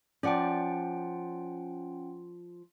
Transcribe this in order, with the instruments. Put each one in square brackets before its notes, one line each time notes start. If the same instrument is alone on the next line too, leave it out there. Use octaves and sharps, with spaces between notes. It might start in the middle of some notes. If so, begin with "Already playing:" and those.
[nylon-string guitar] F3 D5 [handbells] C#4 F#5 G5